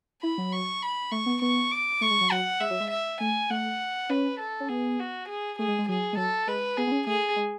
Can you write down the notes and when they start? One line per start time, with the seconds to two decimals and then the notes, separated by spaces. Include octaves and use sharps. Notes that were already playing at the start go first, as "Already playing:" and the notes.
0.22 E4 B5
0.38 F#3
0.52 C#6
0.82 B5
1.11 A3 C#6
1.26 B3
1.42 B3 C#6
1.71 D6
2.01 A3 C#6
2.10 G#3
2.21 F#3
2.31 F#3 F#5
2.60 G#3 E5
2.70 F#3
2.80 G#3
2.90 E5
3.20 A3 G#5
3.50 A3 F#5
4.09 C#4 B4
4.39 A4
4.60 C#4
4.69 B3 G#4
4.99 F#4
5.28 G#4
5.59 A3 G#4
5.68 G#3
5.78 G#3
5.88 F#3 G#4
6.13 G#3
6.17 F#3 A4
6.47 G#3 B4
6.77 B3 G#4
6.87 B3
6.92 C#4
7.07 A3 G#4
7.36 G#3